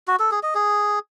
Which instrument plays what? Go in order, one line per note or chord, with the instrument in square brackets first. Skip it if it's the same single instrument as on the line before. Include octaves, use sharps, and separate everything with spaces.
[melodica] F#4
A4
G#4
D#5
G#4